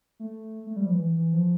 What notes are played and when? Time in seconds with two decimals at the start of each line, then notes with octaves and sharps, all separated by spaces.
0.20 A3
0.66 A3
0.76 G3
0.86 F3
0.95 E3
1.14 E3
1.33 F3